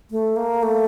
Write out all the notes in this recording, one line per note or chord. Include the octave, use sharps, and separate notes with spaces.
A3
A#3
A3